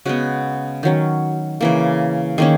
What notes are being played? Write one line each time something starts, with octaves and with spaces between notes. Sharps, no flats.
C#3 G#3 B3 F#4
D#3 F#3 C#4
C#3 E3 A#3
D#3 A#3 C#4 G#4